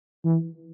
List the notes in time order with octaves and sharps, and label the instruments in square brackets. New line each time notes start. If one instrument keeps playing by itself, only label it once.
[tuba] E3